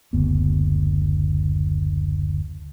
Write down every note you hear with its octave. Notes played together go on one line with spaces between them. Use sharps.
F#1 D2 B3